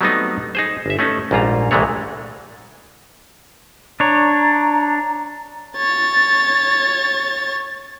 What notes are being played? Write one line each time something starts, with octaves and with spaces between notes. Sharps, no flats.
F#3 G3 A3 B3 C4 D#4
D#4 G#4 C5
G1 E5
A3 C#4 D#4
A#1 G#2 G3 F4 A#5
C2 A#2 E3 G#3 A3 C#5
D4 C#5 A#5
C#5 A6